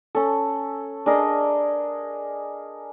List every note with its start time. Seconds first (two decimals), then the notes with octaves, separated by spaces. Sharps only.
0.15 C#4 A4
1.06 D4 G#4 A#4 D#5